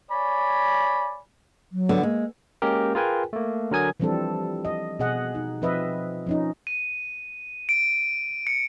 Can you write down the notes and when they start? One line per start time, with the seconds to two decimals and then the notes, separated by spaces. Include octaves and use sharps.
0.10 C#5 D5 G#5 B5
1.72 F#3
1.89 D3 B3
2.03 G#3 A#3
2.62 G#3 A#3 C#4 G4 A#4
2.95 F4 G#4 A#4 B4 G5 G#5
3.33 A3 A#3
3.71 D3 F#3 A#4 G#5 D#6 G#6
4.00 E3 F3 G3 C4 D4 A4
4.65 D#5
4.99 B2 G#4 D#5 F#5
5.35 D#4
5.62 F3 C4 B4 D#5 E5
6.27 F3 C#4 D#4
6.67 D#7
7.69 D7
8.47 C#7